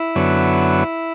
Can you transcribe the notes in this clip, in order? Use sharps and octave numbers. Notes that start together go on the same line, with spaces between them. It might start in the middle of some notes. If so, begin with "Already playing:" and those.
Already playing: E4
F#2 D3 F#3 B3